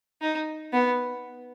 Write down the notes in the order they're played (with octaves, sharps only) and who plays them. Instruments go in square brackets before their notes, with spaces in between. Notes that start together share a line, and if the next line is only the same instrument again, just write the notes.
[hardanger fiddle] D#4
B3